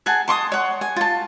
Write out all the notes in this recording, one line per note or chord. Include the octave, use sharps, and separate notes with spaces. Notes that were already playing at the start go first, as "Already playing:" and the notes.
G#4 F#5 G#5 A5
A5 C6 C#6 D#6
C#5 F#5
G#5
F4 A5